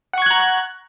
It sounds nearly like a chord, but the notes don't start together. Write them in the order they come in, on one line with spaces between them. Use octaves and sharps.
F#5 C#6 G#6 F#6 A#5